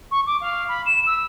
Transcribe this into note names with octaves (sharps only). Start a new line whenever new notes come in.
C#6
D6
F5
B5
E7
E6